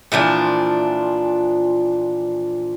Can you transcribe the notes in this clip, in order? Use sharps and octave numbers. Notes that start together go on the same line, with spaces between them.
A#2 E3 F3 D4